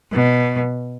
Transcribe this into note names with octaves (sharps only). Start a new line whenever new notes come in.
B2